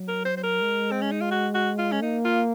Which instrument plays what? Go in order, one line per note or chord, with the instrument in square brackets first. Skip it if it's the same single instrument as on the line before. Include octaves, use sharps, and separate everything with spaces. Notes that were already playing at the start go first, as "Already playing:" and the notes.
Already playing: [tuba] F#3
[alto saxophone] A#4
C5
C5
A#4
[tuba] G#3
[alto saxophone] C4
C#4
D#4
F4
F#4
F#4
F4
C#4
[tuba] A#3 [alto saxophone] D#4
[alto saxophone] F4